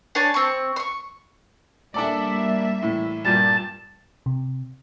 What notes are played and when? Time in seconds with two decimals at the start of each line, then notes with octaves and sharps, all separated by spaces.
0.15 D4 C#5 G#5 A5
0.34 C4 C#6
0.76 C6 C#6
1.94 G3 A#3 D4 A4 D5 E5
2.83 A2 E3
3.25 G2 A#2 G3 A5
4.26 C3